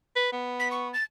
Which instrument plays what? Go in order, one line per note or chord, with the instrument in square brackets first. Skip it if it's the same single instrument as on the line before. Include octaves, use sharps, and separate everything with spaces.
[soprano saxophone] B4
B3
[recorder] B6
C#6
A6